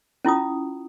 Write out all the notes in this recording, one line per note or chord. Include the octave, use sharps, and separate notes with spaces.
C#4 E4 F4 D#6